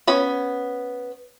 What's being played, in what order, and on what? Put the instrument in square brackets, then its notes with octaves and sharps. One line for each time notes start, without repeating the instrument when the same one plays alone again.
[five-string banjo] B3 C#4 B5